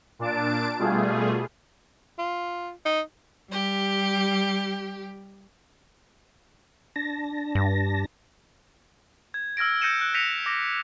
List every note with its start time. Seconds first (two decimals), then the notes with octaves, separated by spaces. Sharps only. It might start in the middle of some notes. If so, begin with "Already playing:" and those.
0.19 A#2 D4 A5 D7
0.79 B2 G3 A3 F4 G#4
2.18 F4
2.85 D#4
3.51 G3 G4
6.96 D4 A5 A#6
7.55 G2
9.34 G#6
9.57 E6 F6 G#6 A#6 D7
9.81 E6 G6 A#6 C#7 D#7 E7
10.01 F#6
10.14 G6 A#6 B6 C#7 D#7 F7
10.46 D6 A#6